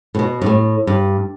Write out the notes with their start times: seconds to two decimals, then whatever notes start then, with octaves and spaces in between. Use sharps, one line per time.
0.15 A2
0.19 B2
0.42 G2
0.46 A2
0.87 G2